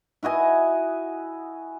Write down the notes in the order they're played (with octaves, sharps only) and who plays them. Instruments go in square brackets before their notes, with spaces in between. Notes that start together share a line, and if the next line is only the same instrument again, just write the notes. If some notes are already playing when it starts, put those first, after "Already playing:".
[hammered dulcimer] E4 F#4 D#5 G#5